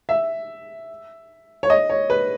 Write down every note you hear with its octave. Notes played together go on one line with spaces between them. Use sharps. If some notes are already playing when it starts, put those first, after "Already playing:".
E5
C#5
D#5
C#5
B4